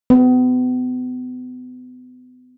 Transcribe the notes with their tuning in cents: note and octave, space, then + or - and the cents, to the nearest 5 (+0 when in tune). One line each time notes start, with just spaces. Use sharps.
B3 +35